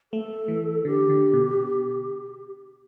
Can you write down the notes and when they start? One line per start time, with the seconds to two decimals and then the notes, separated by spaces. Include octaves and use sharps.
0.13 A3 A4
0.48 E3
0.85 D3 G4
1.10 D3
1.33 B2